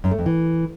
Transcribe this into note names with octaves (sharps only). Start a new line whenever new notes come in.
F#2
A3
F2
E3